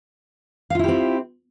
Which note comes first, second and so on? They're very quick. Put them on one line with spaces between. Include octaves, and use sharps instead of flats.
F5 F4 E4 G4 C4